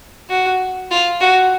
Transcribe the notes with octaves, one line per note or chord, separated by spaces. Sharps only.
F#4
F4
F#4